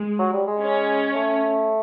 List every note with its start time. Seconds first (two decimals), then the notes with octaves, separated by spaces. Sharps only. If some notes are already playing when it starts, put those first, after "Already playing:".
Already playing: G#3
0.19 F#3
0.33 G3
0.47 G#3
0.60 C#4
1.14 A3